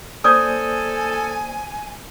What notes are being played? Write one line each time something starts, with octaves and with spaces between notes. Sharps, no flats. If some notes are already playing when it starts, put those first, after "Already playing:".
A#3 A4 C5 D5 G#5 D#6 G6 G#6